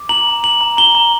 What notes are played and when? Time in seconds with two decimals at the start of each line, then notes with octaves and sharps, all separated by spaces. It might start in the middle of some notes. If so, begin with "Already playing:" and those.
Already playing: D6
0.09 A#5 F#7
0.27 A#5
0.43 A#5 F#7
0.61 A#5
0.77 A#5 G7
0.95 A#5